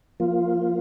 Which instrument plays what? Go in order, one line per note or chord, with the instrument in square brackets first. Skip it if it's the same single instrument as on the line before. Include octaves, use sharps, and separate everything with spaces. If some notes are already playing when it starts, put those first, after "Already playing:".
[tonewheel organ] F3 A#3 F4